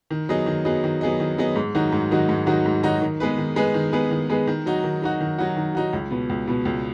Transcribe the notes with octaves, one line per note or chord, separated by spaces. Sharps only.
D#3
F#3 B3 G#4 D#5
D#3
F#3 B3 G#4 D#5
D#3
F#3 B3 G#4 D#5
D#3
F#3 B3 G#4 D#5
G#2
D#3 F#3 D#4 F#4
G#2
D#3 F#3 D#4 F#4
G#2
D#3 F#3 D#4 F#4
G#2
D#3 F#3 D#4 F#4
D#3
G#3 B3 G#4 B4
D#3
G#3 B3 G#4 B4
D#3
G#3 B3 G#4 B4
D#3
G#3 B3 G#4 B4
D#3
F#3 D#4 F#4
D#3
F#3 D#4 F#4
D#3
F#3 D#4 F#4
D#3
F#3 D#4 F#4
C#2
B2 B3
C#2
B2 B3
C#2